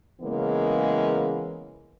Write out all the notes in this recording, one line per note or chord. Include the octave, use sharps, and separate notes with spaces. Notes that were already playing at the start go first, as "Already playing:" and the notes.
C#3 E3 G#3 A#3 B3